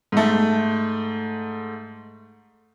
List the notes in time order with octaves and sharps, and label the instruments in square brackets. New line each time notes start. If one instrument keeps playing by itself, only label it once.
[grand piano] G#2 A3